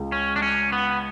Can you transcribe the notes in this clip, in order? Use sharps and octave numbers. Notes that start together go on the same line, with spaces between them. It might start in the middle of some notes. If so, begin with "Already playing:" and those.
Already playing: C#2
C#4
D4
C#4
B3